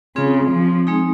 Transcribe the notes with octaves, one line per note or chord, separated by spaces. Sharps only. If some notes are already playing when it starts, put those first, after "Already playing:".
C#3 C4 F4 G#4
F3
G#3 C4 D#4 G#4